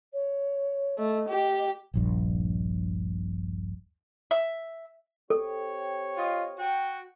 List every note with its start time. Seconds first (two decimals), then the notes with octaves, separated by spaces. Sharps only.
0.13 C#5
0.98 A3 D#5
1.29 G4
1.94 D#1 A#1 G2
4.31 E5
5.30 C4 G4 A4 C#5
6.16 F4 D#5 F5
6.59 F#4 G5